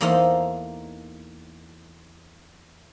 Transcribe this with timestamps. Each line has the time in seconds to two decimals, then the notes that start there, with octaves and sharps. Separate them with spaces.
0.01 E2 A#3 D#4 A4 C5 F5